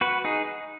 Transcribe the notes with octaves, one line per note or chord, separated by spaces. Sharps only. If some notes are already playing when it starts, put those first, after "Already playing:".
F#4 B4
D#4 G#4